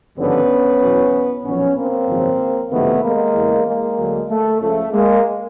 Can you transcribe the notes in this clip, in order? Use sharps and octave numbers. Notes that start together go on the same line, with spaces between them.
G#1 G2 D3 F3 B3 C#4
E2 B2 F#3
B1 A#2 F3 B3 C#4
A#3 C4
G#1 F#2 C#3 F3
F#1 F2 C3 D#3 A3 B3
G#3 A#3
E2 C#3 E3
G#3 A#3
D2 D3 F#3
A3
C#2 C#3 F3 A3
G#3 A#3